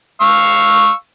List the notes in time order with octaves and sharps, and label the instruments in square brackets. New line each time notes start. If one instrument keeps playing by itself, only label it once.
[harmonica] F5 C#6 E6